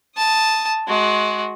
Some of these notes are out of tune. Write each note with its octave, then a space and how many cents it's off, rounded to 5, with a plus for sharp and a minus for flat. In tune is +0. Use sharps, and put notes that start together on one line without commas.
A5 +0 D#6 +0
G#3 +25 F#4 +0